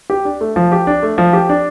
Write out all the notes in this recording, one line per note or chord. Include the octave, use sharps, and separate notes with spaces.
G4
D4
A3
F3
G4
D4
A3
F3
G4
D4